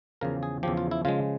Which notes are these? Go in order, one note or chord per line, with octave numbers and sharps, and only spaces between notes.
E2 C#3 F3 A#4
G#4
E2 C#3 F3 G4
F4
E4
C#3 F3 G#3 F4